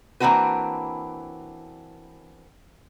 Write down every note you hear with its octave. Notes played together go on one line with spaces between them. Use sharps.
E3 A#3 C4 D4 F#4 B4